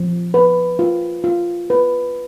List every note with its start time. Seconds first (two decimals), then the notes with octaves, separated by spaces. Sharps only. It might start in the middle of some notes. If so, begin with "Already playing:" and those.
Already playing: F3
0.34 B4
0.79 F4
1.24 F4
1.70 B4